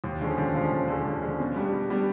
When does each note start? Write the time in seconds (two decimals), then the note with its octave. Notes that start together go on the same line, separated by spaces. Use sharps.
0.04 D#2
0.21 D3 F3 G#3 C#4
0.38 D#2
0.55 D3 F3 G#3 C#4
0.72 D#2
0.88 D3 F3 G#3 C#4
1.05 D#2
1.22 D3 F3 G#3 C#4
1.39 B2
1.56 G3 B3 D4
1.73 B2
1.90 G3 B3 D4